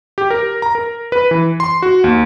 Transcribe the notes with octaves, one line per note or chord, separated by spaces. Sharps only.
G4
A#4
A#5
A#4
B4
E3
C6
F#4
D#2